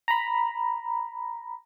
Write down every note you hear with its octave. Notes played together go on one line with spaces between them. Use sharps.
A#5 B5